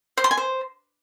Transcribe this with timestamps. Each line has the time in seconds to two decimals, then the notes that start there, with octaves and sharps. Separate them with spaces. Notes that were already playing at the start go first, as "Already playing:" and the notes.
0.17 C5
0.24 C6
0.31 G#5
0.37 C5